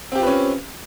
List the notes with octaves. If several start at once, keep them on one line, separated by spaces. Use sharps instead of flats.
C4 C#4 F4 G4 B4